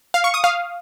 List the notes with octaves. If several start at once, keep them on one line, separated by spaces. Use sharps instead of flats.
F5
C#6
D#6
F5